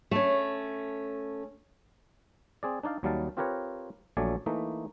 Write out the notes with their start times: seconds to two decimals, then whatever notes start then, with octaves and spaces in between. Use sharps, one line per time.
0.11 A3 C#4
2.63 C4 G#4 D5
2.83 D4 D#4 D5 F5
3.03 D#2 F#3 G3 D#4 F5 A5
3.37 C4 F4 G4 A#4 B4 C#5
4.17 A#1 F#3 A3 D5 G#5
4.46 E3 A3 A#3 D#4